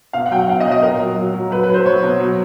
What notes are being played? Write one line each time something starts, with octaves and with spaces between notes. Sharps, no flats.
B2 F5
F#5
F#3 G5
F#5
B2 F5
D#5
F#3
D#5
A#2 A#4
F#3
F#3
F#3
F#3 B4
B4
F#3 C5
F#3 C#5
B2
F#3